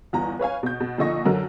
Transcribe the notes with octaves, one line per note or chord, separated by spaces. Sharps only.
G1 E2 A#5
B4 C#5 F5 G#5
B2 G6
B2
A#2 D3 F3 D#5 C#6 A#6
F#2 D3 F#3 A#4